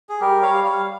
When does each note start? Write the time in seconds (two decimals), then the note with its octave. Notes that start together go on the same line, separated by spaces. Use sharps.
0.09 G#4
0.20 G3 G4 A#4
0.42 G3 C#5 F5
0.64 G3 C#5 F5